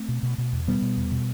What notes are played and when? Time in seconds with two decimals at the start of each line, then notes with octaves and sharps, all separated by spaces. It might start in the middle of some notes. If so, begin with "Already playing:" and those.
Already playing: A3 C4
0.08 B2
0.23 B2
0.38 B2
0.53 E2
0.67 B2 G3 B3
0.82 B2
0.97 E2
1.12 B2